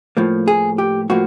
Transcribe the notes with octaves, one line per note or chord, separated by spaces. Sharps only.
A2 F3 A#3
G#4
G4
A2 F3 A#3 F#4